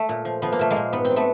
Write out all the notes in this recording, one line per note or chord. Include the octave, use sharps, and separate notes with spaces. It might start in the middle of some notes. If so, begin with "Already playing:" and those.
Already playing: A3
A#2
F3
F3 B3
A#3
A#2 A3
G#3 A#3
A#2
G#2 B3
C4
F#3
A3 B3